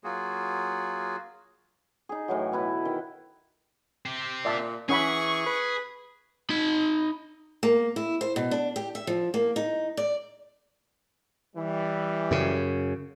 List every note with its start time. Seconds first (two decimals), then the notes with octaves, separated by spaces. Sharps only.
0.04 F#3 A#3 F4 F#4 G#4
2.09 D#4 G#4
2.28 A2 E3 F#3
2.52 B2 E4 B4
2.85 D#3
4.06 C4 G4
4.45 A#2 D5 E5 A5
4.89 E3 C#4 G#4 F#5 B5 C#6
5.46 B4
6.50 D#4 B5
7.63 A#3
7.96 E4
8.21 C5
8.36 B2
8.51 D4
8.76 G4
8.95 E5
9.07 F3
9.34 A#3
9.56 D#4
9.97 D5
11.56 E3 G3
12.31 F#2 C#3